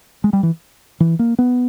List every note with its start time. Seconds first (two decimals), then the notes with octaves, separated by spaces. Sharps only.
0.24 G#3
0.33 G3
0.43 E3
1.00 E3
1.19 A#3
1.39 B3